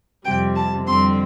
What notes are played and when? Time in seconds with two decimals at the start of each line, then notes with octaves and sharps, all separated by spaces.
0.25 F2 C3 G3 G5
0.56 A5
0.87 F2 D3 G3 C4 C6